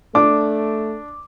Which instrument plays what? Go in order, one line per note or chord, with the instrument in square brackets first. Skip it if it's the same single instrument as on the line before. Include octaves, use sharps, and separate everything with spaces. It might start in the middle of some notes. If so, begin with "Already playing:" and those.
[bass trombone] A3 [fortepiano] D4 [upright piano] D6